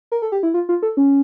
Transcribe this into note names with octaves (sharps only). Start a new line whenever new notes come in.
A#4
A4
G4
E4
F4
F4
A4
C#4